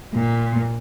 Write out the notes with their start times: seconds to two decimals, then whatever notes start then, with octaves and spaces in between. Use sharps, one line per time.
0.13 A#2